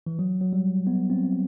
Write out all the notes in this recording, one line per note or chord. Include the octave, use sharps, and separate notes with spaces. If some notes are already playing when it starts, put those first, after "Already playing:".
E3
F#3
F#3
G3
B3
C4